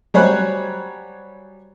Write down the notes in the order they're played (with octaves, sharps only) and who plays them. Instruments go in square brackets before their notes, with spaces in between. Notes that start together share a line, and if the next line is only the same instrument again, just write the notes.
[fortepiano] F#3 G3 C5 C#5 G#5 F#6